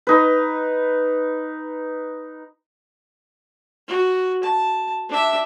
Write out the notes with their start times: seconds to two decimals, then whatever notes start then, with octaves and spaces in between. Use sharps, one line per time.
0.07 D#4 B4
3.88 F#4
4.44 A5
5.09 D4 E5